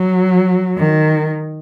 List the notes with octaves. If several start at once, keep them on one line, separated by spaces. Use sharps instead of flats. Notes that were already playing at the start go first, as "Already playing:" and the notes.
Already playing: F#3
D#3